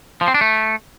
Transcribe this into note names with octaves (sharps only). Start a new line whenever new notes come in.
F3
C4
D4
A3